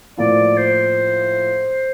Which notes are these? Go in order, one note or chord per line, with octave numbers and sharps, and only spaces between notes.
A2 F3 A#3 E4 D5
C5